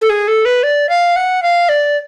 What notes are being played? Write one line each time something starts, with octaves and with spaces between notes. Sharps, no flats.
A4
G#4
A4
B4
D5
F5
F#5
F5
D5